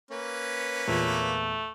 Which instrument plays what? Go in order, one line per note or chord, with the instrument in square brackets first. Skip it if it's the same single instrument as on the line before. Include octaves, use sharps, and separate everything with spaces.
[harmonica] A#3 C#4 B4
[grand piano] E2 A#2 [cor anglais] A3